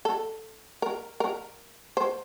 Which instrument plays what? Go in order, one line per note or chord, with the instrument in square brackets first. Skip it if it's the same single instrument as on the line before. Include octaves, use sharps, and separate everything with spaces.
[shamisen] A4
A#4
A#4
C5